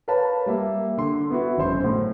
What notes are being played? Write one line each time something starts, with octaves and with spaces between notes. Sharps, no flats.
A#4 B4 C#5 F5 A5 B5
G3 A#3 E5
D3 C6
B3 E4 F#4
G#1 F#2 C5 C6
A2